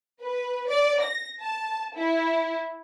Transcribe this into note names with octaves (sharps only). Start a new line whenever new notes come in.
B4
D5
A#6
A5
E4